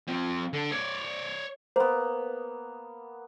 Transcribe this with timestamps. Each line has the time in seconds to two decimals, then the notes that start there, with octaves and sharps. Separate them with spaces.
0.07 F3 C4
0.53 D3
0.72 C#5 D5
1.76 A#3 B3 C5